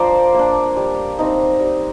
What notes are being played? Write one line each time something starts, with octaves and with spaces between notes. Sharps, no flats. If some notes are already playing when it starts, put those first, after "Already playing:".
Already playing: F3 D4 A#4 C5 D5
A#3 D4
G3
C4 D#4
G3